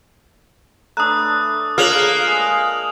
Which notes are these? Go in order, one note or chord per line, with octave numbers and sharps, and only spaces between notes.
A3 D4 B4 A#5 D#6 F#6
A#3 F4 G#4 C#5 F6 F7 F#7
G#3